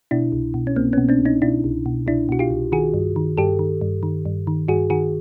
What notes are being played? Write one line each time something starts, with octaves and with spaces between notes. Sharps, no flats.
B2 D4 E4
C2
B2
C#4
C2 A#3 C4
B2 B3 C#4
C4 D4
C2
C#4 D#4
B2 D4 E4
C2
B2
C2 D4 E4
B2 F#4
F4 G4
C2
D#3 F#4 G#4
G2
D#3
G2 G4 A4
D#3
G2
D#3
G2
D#3
G2 F#4 G#4
D#3 F#4 G#4